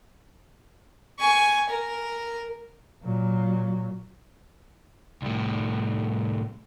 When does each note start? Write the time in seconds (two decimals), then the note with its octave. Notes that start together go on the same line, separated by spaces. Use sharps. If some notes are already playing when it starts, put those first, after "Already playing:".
1.19 G#5 C#6
1.69 A#4
3.04 A#2 F#3
5.22 C2 A2